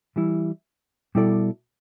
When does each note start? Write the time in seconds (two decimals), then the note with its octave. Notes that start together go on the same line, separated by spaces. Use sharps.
0.16 E3 G3 E4
1.15 B2 G3 E4 A4 D5